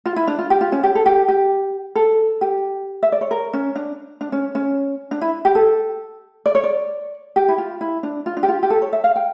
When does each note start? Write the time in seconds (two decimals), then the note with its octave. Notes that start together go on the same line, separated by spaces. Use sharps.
0.06 F4
0.16 E4
0.27 D4
0.39 F4
0.50 G4
0.61 F4
0.72 C#4
0.83 G4
0.95 A4
1.06 G4
1.28 G4
1.95 A4
2.41 G4
3.03 E5
3.12 D5
3.21 C#5
3.31 A#4
3.53 C#4
3.76 D4
4.21 D4
4.32 C#4
4.55 C#4
5.11 D4
5.21 E4
5.45 G4
5.55 A4
6.46 D5
6.55 C#5
6.64 D5
7.36 G4
7.48 E4
7.58 F4
7.81 E4
8.03 D4
8.26 F4
8.37 D4
8.43 G4
8.48 F4
8.63 G4
8.70 A4
8.82 C#5
8.93 E5
9.04 F5
9.16 G5